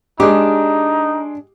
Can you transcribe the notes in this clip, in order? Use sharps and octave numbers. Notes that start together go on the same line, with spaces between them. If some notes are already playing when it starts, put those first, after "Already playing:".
G#3 D4 D#4 G4 D6